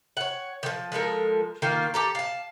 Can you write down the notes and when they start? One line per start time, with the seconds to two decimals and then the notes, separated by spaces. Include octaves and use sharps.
0.17 C#5 F#5
0.63 D#3 F3
0.92 F3 G#3 A4 A#4
1.62 D#3 A#3 F4
1.94 G4 A4 A#5
2.15 F5 A5